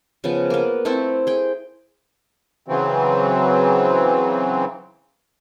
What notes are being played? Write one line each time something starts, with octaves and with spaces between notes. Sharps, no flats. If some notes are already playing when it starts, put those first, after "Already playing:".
C#3 F3 B3
A#3 B3
A3 C4 E4 A4
G#4 G5
C#3 E3 F#3 C4